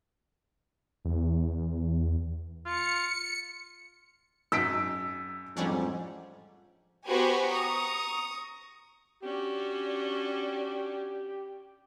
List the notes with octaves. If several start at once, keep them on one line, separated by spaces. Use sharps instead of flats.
E2
F4 C#7
G#1 F#2 D#4 E6 B6 D7
A1 F2 G#2 G3 C#4 D4
B3 F#4 G4 B4 C5 G#5
A#5 C#6 D#6
C#4 D4 F#4 G4